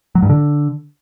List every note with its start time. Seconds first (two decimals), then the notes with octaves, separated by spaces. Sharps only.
0.15 F#3
0.22 G2
0.30 D3